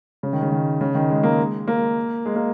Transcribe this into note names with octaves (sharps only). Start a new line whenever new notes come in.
C#3
D#3
C#3
D#3
C#3
D#3
G#3
A#3
G#3
A#3
G#3
A#3